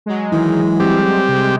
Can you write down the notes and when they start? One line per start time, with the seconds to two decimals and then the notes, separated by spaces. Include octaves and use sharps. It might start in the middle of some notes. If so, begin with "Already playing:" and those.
0.06 F#3 G#3
0.32 D#3 E3
0.80 G3 C4 G4
1.28 C3 G#3